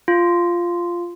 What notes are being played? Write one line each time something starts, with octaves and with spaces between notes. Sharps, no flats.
F4